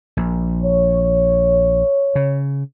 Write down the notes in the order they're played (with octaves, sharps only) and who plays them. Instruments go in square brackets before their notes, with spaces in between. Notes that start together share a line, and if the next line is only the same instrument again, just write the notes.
[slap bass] A#1
[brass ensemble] C#5
[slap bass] C#3